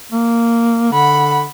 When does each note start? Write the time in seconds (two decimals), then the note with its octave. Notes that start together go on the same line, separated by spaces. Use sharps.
0.12 A#3
0.93 D3 F#5 B5